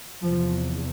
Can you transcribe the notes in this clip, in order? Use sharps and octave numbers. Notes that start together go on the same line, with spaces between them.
E2 C3 F3